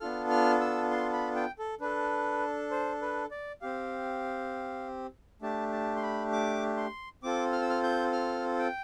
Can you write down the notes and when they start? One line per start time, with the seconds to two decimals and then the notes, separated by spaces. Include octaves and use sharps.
0.01 B3 D4 F4 A4 F6
0.31 F6
0.61 E6
0.91 C6
1.13 B5
1.35 G5
1.59 A4
1.81 D4 A4 B4
2.71 C5
3.02 B4
3.31 D5
3.61 C4 G4 F5
5.42 A3 D4 G4 A5
5.72 A5
5.96 C6
6.02 B5
6.32 D6
6.77 C6
7.23 C4 F4 A4 D6
7.53 F6
7.61 E6
7.70 F6
7.83 G6
8.13 F6
8.59 G5